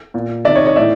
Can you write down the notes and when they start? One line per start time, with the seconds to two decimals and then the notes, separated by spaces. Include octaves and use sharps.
0.14 A#2
0.45 C3 D#3 D5 E5
0.55 C#5 D#5
0.65 C#5 D#5
0.76 A2 E3 D5 E5